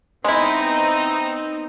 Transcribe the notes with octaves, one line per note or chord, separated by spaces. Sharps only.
G#3 B3 C4 D#4 E4